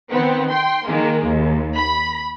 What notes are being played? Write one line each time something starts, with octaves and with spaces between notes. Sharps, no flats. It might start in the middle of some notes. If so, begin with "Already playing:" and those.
D#3 B3 C4
G5 C6
D#3 G#3 A#3
D#2
B5